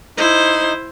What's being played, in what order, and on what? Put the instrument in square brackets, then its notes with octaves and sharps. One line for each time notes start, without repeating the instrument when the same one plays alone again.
[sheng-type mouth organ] D#4 [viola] E4 C5